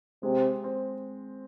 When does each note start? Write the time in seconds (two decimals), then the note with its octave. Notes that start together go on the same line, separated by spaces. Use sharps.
0.23 C3 G#3
0.64 C4